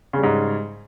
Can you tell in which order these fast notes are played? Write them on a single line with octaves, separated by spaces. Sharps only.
C#3 G3 G#2